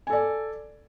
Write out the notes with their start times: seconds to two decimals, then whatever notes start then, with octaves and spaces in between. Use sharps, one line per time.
0.07 G#5
0.10 A4
0.13 D5